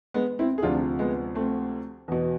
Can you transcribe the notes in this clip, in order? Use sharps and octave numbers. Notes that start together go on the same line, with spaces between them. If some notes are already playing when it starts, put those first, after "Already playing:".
G#3 B3
C4 E4
G#4
D2 C3 F3 D4 F4
G#3 B3
A3 C4
E2 B2